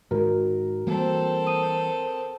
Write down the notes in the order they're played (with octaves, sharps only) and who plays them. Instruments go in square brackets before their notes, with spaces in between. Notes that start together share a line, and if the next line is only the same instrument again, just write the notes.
[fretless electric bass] G#2 D#3 [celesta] F#4 [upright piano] A#4
[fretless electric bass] E3 G3 A#3 [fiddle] C4 A4
[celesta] D#6 D#7